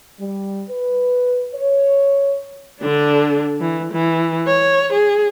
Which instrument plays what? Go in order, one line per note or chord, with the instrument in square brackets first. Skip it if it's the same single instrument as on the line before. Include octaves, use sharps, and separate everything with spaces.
[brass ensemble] G3
B4
C#5
[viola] D3 D4
E3
E3
C#5
G#4